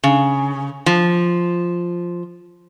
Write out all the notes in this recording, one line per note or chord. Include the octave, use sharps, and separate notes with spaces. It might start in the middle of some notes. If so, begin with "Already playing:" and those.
C#3
F3